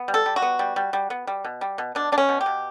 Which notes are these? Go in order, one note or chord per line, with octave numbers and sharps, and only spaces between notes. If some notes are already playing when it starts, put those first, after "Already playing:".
Already playing: B3
G3
A4
G3
F#4
B3
G3
G3
G3
B3
G3
B2
G3
B2
B2 D4
B2 D4
C#4
B2
G4
B2